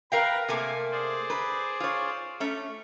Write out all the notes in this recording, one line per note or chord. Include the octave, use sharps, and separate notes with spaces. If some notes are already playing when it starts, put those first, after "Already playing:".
A#4 B4 F5 G5 A#6
C3 A3 A#3 G#5
G#4 C5 D5
B4
F4 C#5
A3 C#4